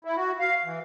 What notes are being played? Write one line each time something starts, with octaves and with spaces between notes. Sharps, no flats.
E4
F#4
F5
E3